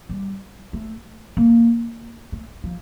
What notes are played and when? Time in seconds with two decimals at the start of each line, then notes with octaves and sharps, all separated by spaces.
0.09 G3
0.73 A3
1.37 A#3
2.32 A3
2.64 F3